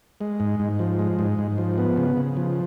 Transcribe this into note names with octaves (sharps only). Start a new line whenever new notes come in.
G#3
G#2
G#2
F3
G#3
G#2
G#2
F3
B3
C#3
C#3
F3